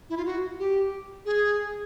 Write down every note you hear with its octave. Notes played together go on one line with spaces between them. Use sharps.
E4
F4
F#4
G4
G#4